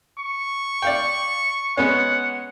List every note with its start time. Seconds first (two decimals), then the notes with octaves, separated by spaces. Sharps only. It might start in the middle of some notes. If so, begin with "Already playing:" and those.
0.19 C#6
0.82 D5 F5 G5
1.77 G#3 B3 C#4 F#5